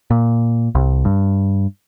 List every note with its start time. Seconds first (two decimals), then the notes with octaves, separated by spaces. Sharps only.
0.11 A#2
0.75 C2
1.05 G2